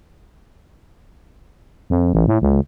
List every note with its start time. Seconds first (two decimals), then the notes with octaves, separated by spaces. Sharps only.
1.90 F2
2.13 A1
2.28 A2
2.42 C#2